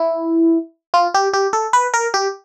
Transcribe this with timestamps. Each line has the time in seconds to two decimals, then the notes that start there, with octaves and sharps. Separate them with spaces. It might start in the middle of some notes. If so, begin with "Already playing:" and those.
Already playing: E4
0.94 F4
1.14 G4
1.34 G4
1.53 A4
1.73 B4
1.94 A#4
2.14 G4